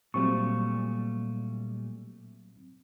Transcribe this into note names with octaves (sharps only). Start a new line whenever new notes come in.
A#2 F#3 G3 A3 C4 C#6